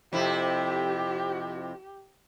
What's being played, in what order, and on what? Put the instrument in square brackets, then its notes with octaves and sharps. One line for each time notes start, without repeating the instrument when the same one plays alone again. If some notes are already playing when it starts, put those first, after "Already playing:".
[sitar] F2 C3 E4 [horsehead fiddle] G4